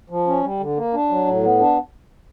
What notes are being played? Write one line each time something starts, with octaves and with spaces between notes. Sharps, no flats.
F3
C#4
G3
D3
A#3
D4
F#3
A2
B3
D4